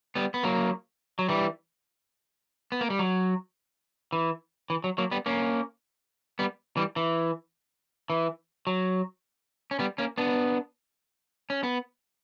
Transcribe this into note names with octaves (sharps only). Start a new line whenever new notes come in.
G3 B3
B3
F#3 A#3
F#3
E3 G3
B3
A#3
G3
F#3
E3
E3
F#3
F#3 A#3
G3 B3
A#3 C#4
G3 B3
E3 G3
E3
E3
F#3
C#4
G3 B3
A#3 C#4
B3 D4
C#4
B3